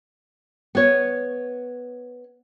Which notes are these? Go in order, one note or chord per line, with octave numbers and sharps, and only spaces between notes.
B3 C#5